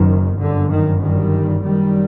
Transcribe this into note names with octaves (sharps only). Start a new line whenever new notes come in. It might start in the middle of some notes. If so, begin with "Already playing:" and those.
Already playing: F#1 F#2 D#3
G1 F#2 D3
D#3
D#3 G3
F#1 F#2 D#3 G3